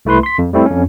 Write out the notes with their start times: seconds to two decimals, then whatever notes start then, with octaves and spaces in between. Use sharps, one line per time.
0.05 C2 A3 E4 B4 C6
0.23 C6 B6
0.38 F2
0.53 G3 A3 C4 E4
0.66 F2 C#4